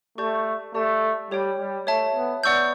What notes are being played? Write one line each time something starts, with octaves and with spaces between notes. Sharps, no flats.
A3 G4 D5 A5 C#6 G6
A3 G4 D5 A5
G3 G4 C#5 G5
G3
A3 C#5 E5 A5
B3
B3 D5 F#5 C#6 E6 G6